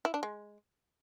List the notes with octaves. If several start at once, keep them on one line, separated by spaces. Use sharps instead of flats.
E4
D4
G#3